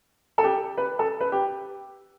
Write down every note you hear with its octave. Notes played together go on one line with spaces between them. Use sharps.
A4
G4
B4
A4
B4
G4